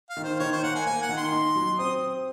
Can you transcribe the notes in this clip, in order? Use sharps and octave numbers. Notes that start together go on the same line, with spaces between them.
F5
D#3
C5
D#3 C#5
C5
A#3 F#5
G#5
A#3 G#5
F#5
D#3
C6
D#4
F#3
C4 D#6